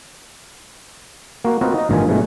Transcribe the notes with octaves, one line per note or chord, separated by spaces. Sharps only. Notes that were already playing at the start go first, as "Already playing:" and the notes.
A#3 F#4
C4 F4 F#4 A#4 B4 D#5
D#4 D#5
A1 G2 D#3 F3 F4 G#5
G2 B2 E3 G#3 A3